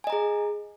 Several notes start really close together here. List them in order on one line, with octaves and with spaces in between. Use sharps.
G#5 D#5 A#5 G#4